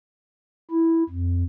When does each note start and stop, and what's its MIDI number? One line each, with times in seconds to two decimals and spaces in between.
0.71 1.03 64
1.09 1.43 41